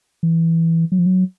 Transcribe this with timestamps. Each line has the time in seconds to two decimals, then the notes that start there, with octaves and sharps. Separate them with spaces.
0.23 E3
0.92 F#3
0.99 F3
1.06 F#3